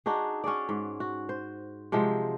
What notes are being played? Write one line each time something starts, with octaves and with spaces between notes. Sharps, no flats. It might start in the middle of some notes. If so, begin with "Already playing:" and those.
D4 D#4 F#4 G#4
C#4 F#4 G#4 D5
G#2
F#4
C5
C3 F3 F#3 G#3